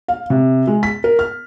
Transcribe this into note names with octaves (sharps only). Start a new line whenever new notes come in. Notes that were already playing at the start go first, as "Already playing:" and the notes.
F5
C3
G#3
B6
A#4
F6